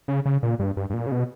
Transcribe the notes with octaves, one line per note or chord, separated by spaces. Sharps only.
C#3
C#3
A#2
G2
G2
G2
A#2
C#3
B2